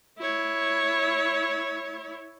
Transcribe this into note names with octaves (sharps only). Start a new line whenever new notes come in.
E4 C#5